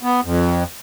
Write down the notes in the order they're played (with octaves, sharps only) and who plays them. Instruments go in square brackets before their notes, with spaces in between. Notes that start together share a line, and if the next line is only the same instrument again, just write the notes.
[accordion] B3
F2